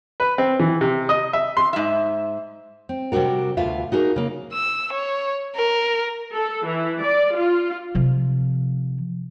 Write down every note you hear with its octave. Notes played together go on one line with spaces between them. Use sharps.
B4
C4
E3
C3
D#5
E5
C6
G#2 E5
C4
C3 G3 C4 D4 F#4 A#4
D2 B2 F4 E5
D#4 F#4 G#4 A#4
C#3 A#3
E6
C#5
A#4
A4
E3
D5
F4
C3 F3